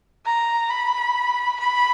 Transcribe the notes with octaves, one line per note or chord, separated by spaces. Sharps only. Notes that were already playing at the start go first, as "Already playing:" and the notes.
A#5
B5
B5